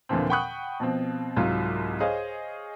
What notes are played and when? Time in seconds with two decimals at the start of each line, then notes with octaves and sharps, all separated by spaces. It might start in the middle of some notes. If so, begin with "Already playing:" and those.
0.09 D#2 A#2 D3 E3 F3 C4
0.29 F#5 G5 B5 C#6 D#6 F#6
0.80 B2 F3 C4
1.37 C2 G#2 F#3 F4
2.00 G#4 C5 C#5 D#5 F5